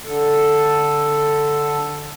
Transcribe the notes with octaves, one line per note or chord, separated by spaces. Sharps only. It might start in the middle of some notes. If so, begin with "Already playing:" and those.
D3 A4